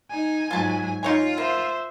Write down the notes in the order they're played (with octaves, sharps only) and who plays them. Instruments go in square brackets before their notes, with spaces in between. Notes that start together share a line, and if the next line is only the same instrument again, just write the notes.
[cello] D#4 [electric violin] G#5
[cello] G#2 F#3 [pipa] F4 A5
[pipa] D#4 C#5 G#5 [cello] F4
[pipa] A#3 [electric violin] C5 E5